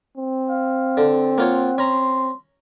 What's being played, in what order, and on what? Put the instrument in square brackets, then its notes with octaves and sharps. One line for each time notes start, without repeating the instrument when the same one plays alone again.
[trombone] C4
[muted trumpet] F5
[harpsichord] D3
[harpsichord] A#3 F4 C#5 [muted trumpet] F#5
[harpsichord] C#4 A#5 [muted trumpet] C6